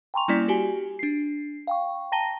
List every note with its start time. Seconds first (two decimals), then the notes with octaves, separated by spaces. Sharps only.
0.14 G5 G#5 A#5 C6 C#6 F7
0.28 G3 A#3 C#4 E4 D5 B6
0.48 F#4 G4 G#5
0.99 D4 C7
1.67 F5 G5 C#6
2.12 G5 A5 A#5 A#6 D#7 G7